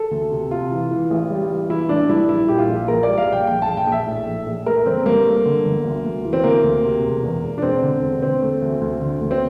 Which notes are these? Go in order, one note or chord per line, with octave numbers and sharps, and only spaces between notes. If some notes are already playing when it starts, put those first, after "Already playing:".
Already playing: A4
D2
C3
C3 F4
E3
E3
A1
G3
E3
E3 E4
A1 D4
G2 E4
A#1 E4
A#2 G4
F4
A#1
A#1 A#4
G3 D5
F5
A#1
G5
A#1 G5
A5
A#1
G5
A#1
E5
A2
A#1
A#1
A3 A#4
G1 C4
G2 A#3
A3
D3
G1
D2
D2
E3
C4
D2 A#3
D2
C3
E1
E2
E1
D4
E1 C4
D3
E1
D3 C4
A3
D2
D2
D3
D2
C4